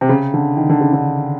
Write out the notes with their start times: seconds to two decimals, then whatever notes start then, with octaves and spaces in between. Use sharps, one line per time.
0.01 C3
0.09 C#3
0.34 D3
0.57 D#3
0.69 D3
0.81 C#3
0.93 D3